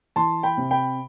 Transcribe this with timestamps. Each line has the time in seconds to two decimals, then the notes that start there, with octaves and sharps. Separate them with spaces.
0.16 E3 A5 C6
0.43 G5 B5
0.57 C3
0.71 G5 B5